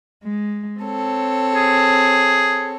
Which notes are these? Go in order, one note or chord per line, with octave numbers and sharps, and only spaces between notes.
G#3
C4 A4 C#5
G#4